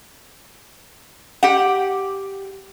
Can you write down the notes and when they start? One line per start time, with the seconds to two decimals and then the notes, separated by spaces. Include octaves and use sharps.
1.43 G4 F#5